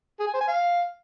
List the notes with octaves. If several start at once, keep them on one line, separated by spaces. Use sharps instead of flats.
G#4
G#5
C5
G#5
F5